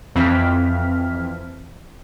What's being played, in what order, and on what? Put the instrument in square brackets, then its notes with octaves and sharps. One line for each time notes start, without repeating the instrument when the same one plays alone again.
[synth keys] F2 E3 C4 F6 B6